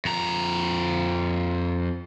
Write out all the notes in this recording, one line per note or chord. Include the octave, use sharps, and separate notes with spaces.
F2 A#5